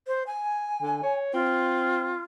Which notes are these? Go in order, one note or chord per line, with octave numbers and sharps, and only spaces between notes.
C5
G#5
D3
C#5
C4 F4